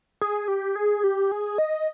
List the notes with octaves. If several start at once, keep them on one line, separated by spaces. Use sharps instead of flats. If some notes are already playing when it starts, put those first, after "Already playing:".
G#4
G4
G#4
G4
G#4
D#5